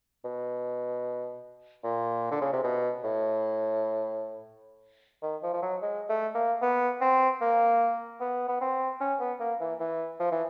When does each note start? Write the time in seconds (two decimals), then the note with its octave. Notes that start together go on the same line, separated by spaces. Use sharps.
0.24 B2
1.84 A#2
2.31 D3
2.41 C#3
2.53 C3
2.64 B2
3.04 A2
5.22 D#3
5.43 F3
5.53 F3
5.62 F#3
5.82 G#3
6.09 A3
6.35 A#3
6.62 B3
7.01 C4
7.41 A#3
8.20 B3
8.49 B3
8.61 C4
9.01 C#4
9.20 B3
9.40 A#3
9.60 E3
9.80 E3
10.20 F3
10.31 E3